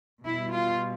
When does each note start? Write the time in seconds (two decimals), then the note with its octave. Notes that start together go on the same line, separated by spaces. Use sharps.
0.25 B2 G3 E4
0.54 F4